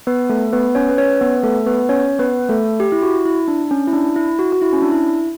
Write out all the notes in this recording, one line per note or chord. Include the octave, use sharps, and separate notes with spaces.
B3 B4
A3 A4
B3 B4
C#4 C#5
B4
C#4 C#5
B3 B4
A3 A4
B3 B4
C#4 C#5
B3 B4
A3 A4
G4
E4
F#4
E4
D4
C#4
E4
D4
E4
F#4
F#4
E4
C#4
D4
E4